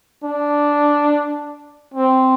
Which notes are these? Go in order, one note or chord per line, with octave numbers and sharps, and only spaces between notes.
D4
C4